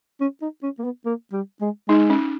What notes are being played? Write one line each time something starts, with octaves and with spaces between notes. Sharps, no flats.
C#4
D#4
C#4
A#3
B3
A#3
G3
G#3
G#3 D#4
C#4